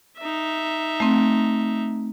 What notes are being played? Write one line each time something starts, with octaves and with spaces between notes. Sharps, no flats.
D#4 E5
A3 C4